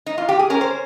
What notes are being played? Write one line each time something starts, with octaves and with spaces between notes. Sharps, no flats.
D#4
F4
G4
G#4
C#4 A#4
C5